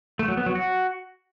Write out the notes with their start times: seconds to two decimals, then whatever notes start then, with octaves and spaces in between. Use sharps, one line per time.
0.19 A3
0.28 F#3
0.37 B3
0.46 F#3
0.55 F#4